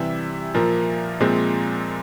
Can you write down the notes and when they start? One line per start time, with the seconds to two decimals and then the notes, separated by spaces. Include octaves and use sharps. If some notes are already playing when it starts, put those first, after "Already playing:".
Already playing: C3 E3 G3 E5
0.54 A#2 F3 A#3
1.20 A#2 F3 G#3 C4